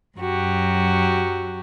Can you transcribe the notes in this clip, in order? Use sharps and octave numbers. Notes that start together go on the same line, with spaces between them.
F#2 F#3 F#4 G4